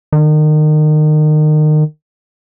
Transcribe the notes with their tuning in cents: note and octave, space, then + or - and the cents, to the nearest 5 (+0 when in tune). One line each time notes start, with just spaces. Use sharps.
D#3 -30